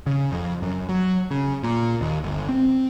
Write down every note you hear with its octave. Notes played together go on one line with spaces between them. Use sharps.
C#3
F2
F#2
F#3
C#3
A#2
D#2
G1
C4